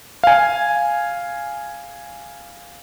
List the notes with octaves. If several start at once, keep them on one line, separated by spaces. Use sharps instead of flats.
F5 G#5